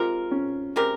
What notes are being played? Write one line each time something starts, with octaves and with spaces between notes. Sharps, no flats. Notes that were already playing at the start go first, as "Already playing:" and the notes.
Already playing: G#3 C4 F4 G4 A#4
C#4
G#3 C4 G4 A#4